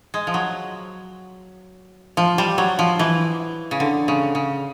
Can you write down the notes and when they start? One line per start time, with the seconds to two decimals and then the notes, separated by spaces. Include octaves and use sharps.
0.14 G#3
0.27 F3
0.34 F#3
2.17 F3
2.38 G3
2.58 F#3
2.79 F3
2.99 E3
3.71 C#3
3.80 D3
4.08 C#3
4.35 C#3